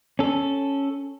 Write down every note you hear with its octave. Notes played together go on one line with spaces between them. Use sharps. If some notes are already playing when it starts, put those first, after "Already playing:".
C#4 A4